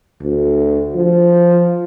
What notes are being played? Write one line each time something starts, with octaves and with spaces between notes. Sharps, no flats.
D2
F3